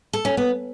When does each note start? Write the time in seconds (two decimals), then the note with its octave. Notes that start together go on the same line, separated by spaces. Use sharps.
0.13 A4
0.25 C#4
0.37 B3